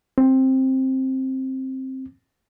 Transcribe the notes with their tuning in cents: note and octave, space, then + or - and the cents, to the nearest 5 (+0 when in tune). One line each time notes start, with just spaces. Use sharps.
C4 +10